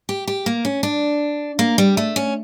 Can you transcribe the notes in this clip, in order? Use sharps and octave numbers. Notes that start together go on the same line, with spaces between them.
G4
G4
A#3
C#4
D4
A#3
G3
A3
C#4